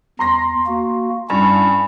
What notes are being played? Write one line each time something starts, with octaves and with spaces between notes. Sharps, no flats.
E2 A#5 C6 A#6
A#3 F#4
G2 C#4 D4 E4